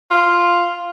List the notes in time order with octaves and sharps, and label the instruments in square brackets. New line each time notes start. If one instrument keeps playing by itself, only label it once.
[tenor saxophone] F4